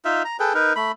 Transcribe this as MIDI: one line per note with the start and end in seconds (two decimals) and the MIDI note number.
0.05 0.23 63
0.05 0.23 65
0.05 0.23 76
0.25 0.37 82
0.40 0.53 68
0.40 0.53 69
0.40 0.53 71
0.40 0.53 79
0.54 0.73 63
0.54 0.73 70
0.54 0.73 71
0.76 0.92 57
0.76 0.92 83